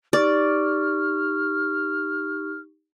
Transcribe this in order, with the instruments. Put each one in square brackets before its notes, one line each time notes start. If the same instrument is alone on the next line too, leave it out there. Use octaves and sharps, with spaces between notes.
[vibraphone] D#4 G4 C#6 [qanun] D5 [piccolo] F6